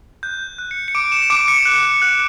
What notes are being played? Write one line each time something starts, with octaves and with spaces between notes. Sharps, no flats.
F#6 G6
F#6
C#7
C#7
D6 D7
E7
E7
D6 D7
C#7
F#6 C#7
F#6